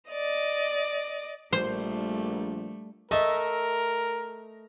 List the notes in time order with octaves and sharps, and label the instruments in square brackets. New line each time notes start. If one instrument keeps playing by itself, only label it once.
[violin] D5 D#5
[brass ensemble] A#1 [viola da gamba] G3 A3 [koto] C5
[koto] A3 E5 [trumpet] A#4 [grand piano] D#5